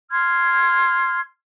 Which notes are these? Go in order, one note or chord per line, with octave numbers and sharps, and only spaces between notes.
C6 F6 G#6